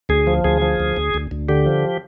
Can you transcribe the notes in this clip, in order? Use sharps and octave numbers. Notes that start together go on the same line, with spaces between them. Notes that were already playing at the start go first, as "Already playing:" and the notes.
D2 G#4
F3
D2 G#4
F3
D2
D2
D2
D2
D3 G4
F3